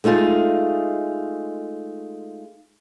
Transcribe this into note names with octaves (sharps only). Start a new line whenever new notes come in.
G#3 A3 D#4 F4 G#4